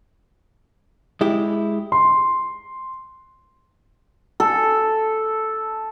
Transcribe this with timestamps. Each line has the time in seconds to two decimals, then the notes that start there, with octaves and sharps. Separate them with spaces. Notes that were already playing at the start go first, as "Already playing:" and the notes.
1.21 G#3 E4 G4
1.92 C6
4.40 A4